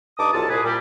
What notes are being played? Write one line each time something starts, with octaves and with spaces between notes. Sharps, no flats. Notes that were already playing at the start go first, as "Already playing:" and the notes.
G2 D#4 A5 D6 D#6
C2 F#3 G#3 F4 A4 A5
C2 A#2 G#4 B4
A#2 G3